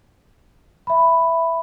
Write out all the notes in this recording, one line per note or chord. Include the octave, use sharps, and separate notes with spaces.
E5 B5